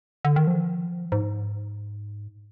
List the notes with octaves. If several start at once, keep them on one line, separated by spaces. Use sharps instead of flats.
D3
D#3
F3
G#2